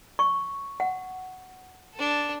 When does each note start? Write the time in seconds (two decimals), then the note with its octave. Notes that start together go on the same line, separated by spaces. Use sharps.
0.19 C#6
0.80 F#5
1.95 D4 A4